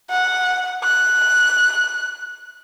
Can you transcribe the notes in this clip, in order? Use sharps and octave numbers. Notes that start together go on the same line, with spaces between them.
F#5
F#6